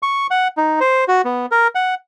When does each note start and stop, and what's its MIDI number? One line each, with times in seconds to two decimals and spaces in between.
0.03 0.27 85
0.31 0.48 78
0.57 0.80 63
0.80 1.04 72
1.08 1.22 66
1.25 1.46 59
1.51 1.68 70
1.75 1.95 78